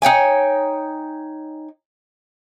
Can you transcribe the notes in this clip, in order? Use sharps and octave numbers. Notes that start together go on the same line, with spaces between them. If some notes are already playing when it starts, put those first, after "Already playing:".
D#4 C#5 G5 G#5